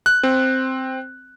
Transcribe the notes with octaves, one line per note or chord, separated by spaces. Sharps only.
F#6
C4